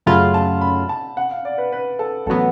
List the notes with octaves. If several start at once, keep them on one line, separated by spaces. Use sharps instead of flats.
F#2 C#3 F#3 A3 F4 B5
A5
B5
A5
F#5
F5
D5
B4
B4
A4
A1 F#3 B3 A4